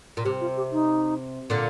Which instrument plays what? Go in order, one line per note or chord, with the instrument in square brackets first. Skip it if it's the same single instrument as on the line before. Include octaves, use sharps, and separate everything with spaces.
[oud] A#2
[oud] C3 [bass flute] G4
[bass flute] F4
G4
D#4
[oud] A#2 D3